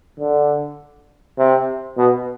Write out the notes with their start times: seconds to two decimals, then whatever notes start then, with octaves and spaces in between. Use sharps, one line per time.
0.19 D3
1.38 C3
1.97 B2